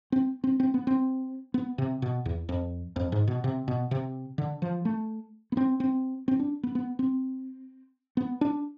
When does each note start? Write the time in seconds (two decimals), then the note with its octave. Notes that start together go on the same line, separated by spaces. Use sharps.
0.12 C4
0.44 C4
0.60 C4
0.74 B3
0.87 C4
1.54 B3
1.78 C3
2.02 B2
2.26 E2
2.49 F2
2.96 F2
3.12 G#2
3.27 B2
3.44 C3
3.68 B2
3.91 C3
4.38 D3
4.62 F3
4.85 A3
5.52 B3
5.57 C4
5.80 C4
6.28 C4
6.39 D4
6.63 B3
6.75 B3
6.99 C4
8.17 B3
8.41 D4